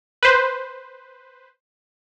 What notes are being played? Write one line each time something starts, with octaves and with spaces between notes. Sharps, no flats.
B4 C5